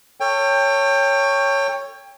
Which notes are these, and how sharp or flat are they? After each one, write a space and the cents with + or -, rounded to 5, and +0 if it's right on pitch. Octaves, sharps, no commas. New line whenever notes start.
A4 +30 C#5 +0 G5 +25